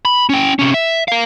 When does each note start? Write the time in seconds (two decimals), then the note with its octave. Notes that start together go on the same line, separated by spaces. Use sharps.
0.05 B5
0.29 C#4 G5
0.59 C3 C#4
0.74 E5
1.08 A#4 F5